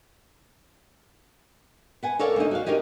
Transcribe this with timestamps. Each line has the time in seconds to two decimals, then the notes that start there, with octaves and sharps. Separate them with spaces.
2.03 B4 F#5 G#5
2.19 A4 A#4 C#5 D5 F5
2.36 D2 D#4
2.51 F#4 F5
2.66 C#4 D#4 G4 A#4 C5 C#5